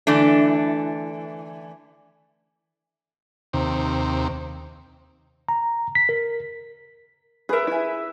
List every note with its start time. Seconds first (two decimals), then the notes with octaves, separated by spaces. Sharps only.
0.07 D3 E3 A3 D4
3.53 D#2 C3
5.49 A#5
5.95 B6
6.09 A#4
7.49 G#4 A#4 B4 E5
7.67 E4 G#4